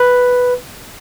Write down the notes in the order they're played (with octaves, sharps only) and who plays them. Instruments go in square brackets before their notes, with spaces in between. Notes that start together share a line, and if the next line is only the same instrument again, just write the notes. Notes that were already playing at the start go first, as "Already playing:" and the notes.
Already playing: [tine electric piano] B4